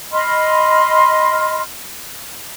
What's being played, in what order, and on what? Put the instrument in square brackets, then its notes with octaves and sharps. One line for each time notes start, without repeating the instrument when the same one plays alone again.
[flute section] D#5 B5 C6 F6